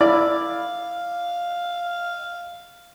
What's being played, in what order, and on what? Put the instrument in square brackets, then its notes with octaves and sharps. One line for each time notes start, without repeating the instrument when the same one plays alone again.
[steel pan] E4 [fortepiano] D5 [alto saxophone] F5